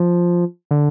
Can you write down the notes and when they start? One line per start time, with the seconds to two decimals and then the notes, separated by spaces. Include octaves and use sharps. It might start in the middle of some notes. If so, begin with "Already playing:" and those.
Already playing: F3
0.71 D3